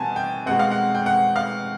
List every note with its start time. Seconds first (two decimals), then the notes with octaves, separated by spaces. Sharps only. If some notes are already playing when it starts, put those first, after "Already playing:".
Already playing: B2 G3 C4 G#5 A5
0.16 G5
0.46 B2 G#3 C4 F#5
0.59 F5
0.71 F#5
0.95 G5
1.06 F#5
1.36 F5